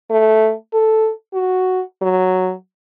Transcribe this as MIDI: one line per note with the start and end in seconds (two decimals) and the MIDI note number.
0.11 0.53 57
0.74 1.11 69
1.34 1.83 66
2.02 2.53 54